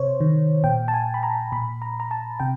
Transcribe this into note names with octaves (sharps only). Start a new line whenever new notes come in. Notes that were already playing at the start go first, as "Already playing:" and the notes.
Already playing: C3 C5 C#5
D#3
A#2 G5
A5
G#5
B5
A#5
A#2 B5
A#5
A#5
A5
C3 G5